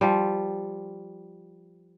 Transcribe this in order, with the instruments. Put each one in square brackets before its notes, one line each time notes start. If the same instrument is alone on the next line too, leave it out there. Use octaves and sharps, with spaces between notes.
[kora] F3 G3